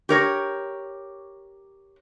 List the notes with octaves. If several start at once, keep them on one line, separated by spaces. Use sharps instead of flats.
G4 A#4 C#5